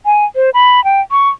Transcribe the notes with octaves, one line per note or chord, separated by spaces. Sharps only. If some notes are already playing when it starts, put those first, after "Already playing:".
G#5
C5
B5
G5
C#6